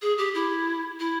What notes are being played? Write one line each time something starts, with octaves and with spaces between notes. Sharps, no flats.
G#4
G4
E4
E4